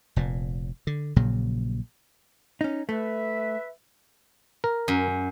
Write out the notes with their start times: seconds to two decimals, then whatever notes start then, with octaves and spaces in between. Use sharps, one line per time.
0.16 F1 A#2
0.87 D3
1.16 A#1 A#2 C#3 F#3
2.61 C#4 D#4
2.89 A3 B4 E5
4.64 A#4
4.88 F#2